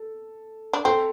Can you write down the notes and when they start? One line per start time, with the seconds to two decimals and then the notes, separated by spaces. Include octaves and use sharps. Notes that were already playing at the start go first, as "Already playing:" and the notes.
Already playing: A4
0.73 D4
0.85 C4 A4